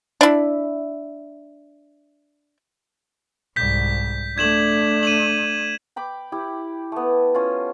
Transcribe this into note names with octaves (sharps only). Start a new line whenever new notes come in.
D4 E4
C2 G#2 G6 B6
A3 D4 G#6 E7 F#7
D#7 E7 F#7
G5 B5 D6
E4 G4
A3 B3
C#4 F4